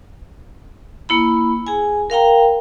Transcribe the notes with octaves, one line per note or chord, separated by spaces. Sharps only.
A#3 E4 B5
G#4 G#5
A#4 F5 G5 A#5